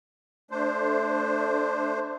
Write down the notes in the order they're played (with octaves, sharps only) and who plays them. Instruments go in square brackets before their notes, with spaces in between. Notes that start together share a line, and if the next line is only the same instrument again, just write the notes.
[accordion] A3 D4 C5